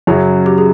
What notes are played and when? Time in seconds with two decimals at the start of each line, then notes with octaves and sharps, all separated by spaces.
0.07 F#2 C#3 F#3 G#4
0.46 G4
0.58 G#4